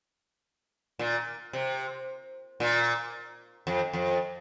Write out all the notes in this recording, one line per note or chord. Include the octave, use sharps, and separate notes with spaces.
A#2
C3
A#2
F2
F2